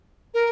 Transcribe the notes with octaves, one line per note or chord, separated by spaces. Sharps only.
A#4